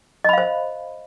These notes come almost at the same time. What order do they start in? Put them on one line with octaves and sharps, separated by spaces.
D#5 B5 F5 C5